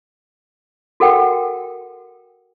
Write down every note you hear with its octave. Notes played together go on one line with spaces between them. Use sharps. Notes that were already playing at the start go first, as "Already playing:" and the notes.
F#4 A4 A#4 F#5 G5